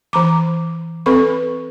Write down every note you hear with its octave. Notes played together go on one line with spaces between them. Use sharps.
E3 A#5 D6
C4 A4 B4 B5 C#6